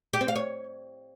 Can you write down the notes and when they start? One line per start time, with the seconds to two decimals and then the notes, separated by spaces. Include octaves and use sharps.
0.13 G4
0.21 C4
0.28 F5
0.36 C#5